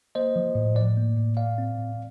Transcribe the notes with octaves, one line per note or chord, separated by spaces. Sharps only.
A#3 C5 D#5
F3
A2
A2 D5
A#3
A2
A2 D5 F5
C4
A2